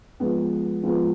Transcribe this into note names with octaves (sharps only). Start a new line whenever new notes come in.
F3 G#3 B3
F3 G#3 B3